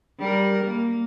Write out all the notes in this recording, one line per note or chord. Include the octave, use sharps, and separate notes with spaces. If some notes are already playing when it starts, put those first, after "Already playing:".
G3 A#4
A#3